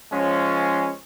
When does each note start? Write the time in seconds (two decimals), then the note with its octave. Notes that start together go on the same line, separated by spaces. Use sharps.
0.12 F3 G#3 C#4